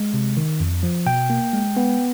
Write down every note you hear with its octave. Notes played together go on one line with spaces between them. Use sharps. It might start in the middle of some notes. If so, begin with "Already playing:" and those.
Already playing: G#3
C3
D#3
F2
F3
B2 G5
A#3
G#3
B3